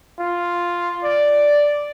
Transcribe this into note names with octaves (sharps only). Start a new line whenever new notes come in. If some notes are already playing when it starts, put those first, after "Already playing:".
F4
D5